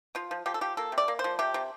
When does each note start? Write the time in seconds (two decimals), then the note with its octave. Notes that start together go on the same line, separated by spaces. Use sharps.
0.15 F3 F4
0.31 F3
0.46 F3 G4
0.54 A4
0.61 F3 G4
0.77 A#3 A4
0.92 C3
0.98 D5
1.08 A#3
1.19 C5
1.24 F3
1.39 C3 G4
1.54 C3